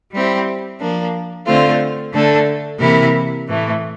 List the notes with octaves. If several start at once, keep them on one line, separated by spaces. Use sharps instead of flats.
G3 C4 E4 G4
F3 A#3 D4
D3 A3 C4 F4
D3 A3 D4 A4
C3 E3 A#3 E4 A#4
A2 E3 A3